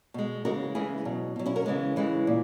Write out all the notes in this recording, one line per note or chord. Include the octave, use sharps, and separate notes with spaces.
B2 G#3
C#3 E3 G#3 F#4 A#4
C#3 E3 G#3 E4 G#4
B2 F#3
B2 F#3
C#4 E4
F#4 A#4
C#3 E3 G#3
C#3 E3 G#3
A#2